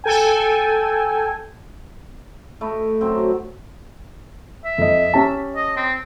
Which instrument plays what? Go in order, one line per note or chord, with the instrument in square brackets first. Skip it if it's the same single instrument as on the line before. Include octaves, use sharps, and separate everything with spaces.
[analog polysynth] A4 G5 G#5
[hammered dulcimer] A3 E4 D#5
F#2 F#3 C4
[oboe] E5
[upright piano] F2 D#5
C#4 G4 A5
[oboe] D#5
C4